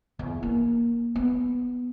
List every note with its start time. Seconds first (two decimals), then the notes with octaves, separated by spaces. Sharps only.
0.19 E2
0.43 A#3
1.15 B3